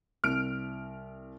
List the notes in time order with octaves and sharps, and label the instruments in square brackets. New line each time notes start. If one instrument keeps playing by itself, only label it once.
[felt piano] C2 [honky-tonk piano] F6 D7